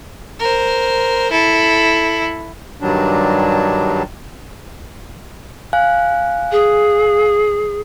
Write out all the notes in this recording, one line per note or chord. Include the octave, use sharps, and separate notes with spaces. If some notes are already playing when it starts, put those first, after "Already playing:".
A#4 C5
E4 A4
G2 D#3 F#3 G3 D4
F5 G#5 F#6
G#4